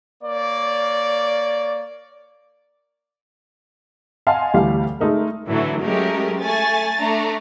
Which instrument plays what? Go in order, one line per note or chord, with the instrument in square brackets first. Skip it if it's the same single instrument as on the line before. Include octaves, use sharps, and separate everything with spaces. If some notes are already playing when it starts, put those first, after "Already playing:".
[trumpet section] A#3 C#5 D5
[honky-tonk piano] D#5 F5 F#5 G#5 A5 C6
D2 E3 G3 G4 F5
G#3 A3 D#4 A#4
[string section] A2 D3 E3 F#3 A3
F#3 G#3 A3 C#4 G4 A#4
A3 G#5 A6
A3 D4 A#5